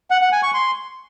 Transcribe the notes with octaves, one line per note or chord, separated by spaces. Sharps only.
F#5
F#5
G#5
C#6
C6